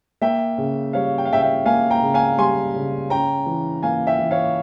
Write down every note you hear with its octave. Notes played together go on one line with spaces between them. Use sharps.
A#3 E5 G5
C#3
G3 C#5 F5
G5
F5
C#3 E5 G5
E5 G5
A#3 F5 G#5
G5 A#5
C#3
F5 G#5
G3 G#5 C6
C#3
C#4 G5 A#5
E3
A#3 F5 G#5
E5 G5
E3
C#5 F5